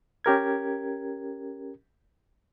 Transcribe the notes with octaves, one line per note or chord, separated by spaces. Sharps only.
C#4 G4 A#4 G#6